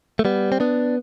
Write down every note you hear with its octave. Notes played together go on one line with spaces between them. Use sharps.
A3
G3 B3
C4
B3 D4